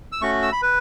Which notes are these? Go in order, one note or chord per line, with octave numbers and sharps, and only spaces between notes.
E6
A3 C#4 F#4 C#6
E6
B5
B4